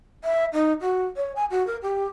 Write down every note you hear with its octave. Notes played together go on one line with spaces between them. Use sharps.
E5
D#4
F#4
C#5
G#5
F#4
A#4
G4